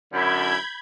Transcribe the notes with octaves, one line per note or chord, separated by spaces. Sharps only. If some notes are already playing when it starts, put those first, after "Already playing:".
F#2 D3 E4 B5 G6 G#6